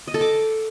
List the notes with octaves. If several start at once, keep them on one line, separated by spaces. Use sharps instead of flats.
D#5
A4
D6